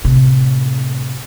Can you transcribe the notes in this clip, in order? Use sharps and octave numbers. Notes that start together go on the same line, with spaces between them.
A2 C3